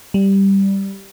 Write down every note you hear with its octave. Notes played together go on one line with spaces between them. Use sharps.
G3